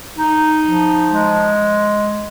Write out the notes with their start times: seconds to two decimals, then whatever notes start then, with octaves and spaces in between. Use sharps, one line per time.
0.17 D#4
0.63 F3
1.10 G#3